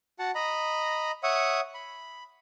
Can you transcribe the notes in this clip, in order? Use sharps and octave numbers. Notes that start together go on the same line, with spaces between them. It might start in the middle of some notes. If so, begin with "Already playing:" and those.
F#4 F#5 A5
D#5 A#5 B5
C#5 E5 F#5 D#6
B5